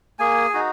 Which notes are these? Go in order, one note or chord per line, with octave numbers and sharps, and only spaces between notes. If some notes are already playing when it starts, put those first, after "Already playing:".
A#3 G#4 G#5
D#4 F#4